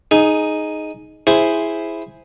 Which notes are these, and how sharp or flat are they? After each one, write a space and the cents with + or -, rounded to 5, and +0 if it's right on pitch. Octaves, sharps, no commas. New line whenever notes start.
D#4 +0 G#4 +15
E4 +0 G#4 +0 C5 +0